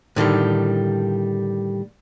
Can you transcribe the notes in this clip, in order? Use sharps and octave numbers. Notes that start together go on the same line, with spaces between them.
A2 D3 D#3 G3